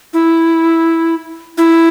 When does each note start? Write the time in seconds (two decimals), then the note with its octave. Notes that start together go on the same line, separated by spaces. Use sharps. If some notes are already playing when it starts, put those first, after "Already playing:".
0.13 E4
1.58 E4